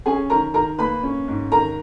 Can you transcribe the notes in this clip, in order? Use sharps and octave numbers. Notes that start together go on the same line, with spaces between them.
C#4 G#4 G#5
D#3 A#4 A#5
D#3 A#4 A#5
A#3 B4 B5
C#4
G#2
D#3 A#4 A#5